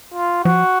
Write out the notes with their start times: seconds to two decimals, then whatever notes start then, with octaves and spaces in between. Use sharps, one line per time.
0.14 F4
0.44 F3 F#4